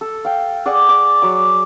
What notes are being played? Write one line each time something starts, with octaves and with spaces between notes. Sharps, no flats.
A4
F5 G5
G#4 D5 F#5
D6
F#3 D6